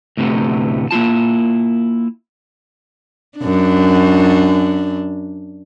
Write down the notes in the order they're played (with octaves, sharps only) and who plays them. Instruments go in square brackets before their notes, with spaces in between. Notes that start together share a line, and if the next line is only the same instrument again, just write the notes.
[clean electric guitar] D2 A2 C3 A3 B3
A#3 E4 F4 A5
[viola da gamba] F#2 D4